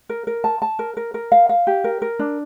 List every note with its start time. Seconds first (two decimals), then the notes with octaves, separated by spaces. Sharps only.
0.09 A#4
0.27 A#4
0.44 A5
0.62 A5
0.79 A#4
0.97 A#4
1.14 A#4
1.32 F5
1.49 F5
1.67 G4
1.84 A#4
2.02 A#4
2.19 D4